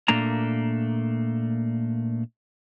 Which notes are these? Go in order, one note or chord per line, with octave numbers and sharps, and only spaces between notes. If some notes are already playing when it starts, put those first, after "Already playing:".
A#2 A3 A#3 D4 A#5